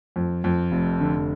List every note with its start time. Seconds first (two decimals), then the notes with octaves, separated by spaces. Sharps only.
0.16 F2
0.44 F2
0.72 F1
1.01 D3